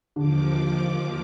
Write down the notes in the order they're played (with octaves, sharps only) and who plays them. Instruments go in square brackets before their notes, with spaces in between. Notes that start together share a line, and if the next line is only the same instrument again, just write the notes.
[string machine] D#2 F3 D6 [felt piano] D3